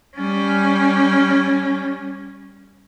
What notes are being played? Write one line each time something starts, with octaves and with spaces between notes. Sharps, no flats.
G3 C#4